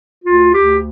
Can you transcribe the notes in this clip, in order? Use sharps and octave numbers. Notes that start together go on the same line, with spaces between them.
D2 F4
D2 G4